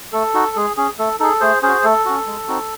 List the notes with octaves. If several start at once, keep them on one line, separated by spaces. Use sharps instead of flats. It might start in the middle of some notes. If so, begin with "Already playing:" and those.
A3 A4
D#4 F#4
G#3 G#4
C#4 G#4
A3 A4
D#4 G#4 A4
A3 G#4 C5
C#4 F#4 G#4 C5
A3 A4
C#4 F#4
G#3
C4 D#4 F#4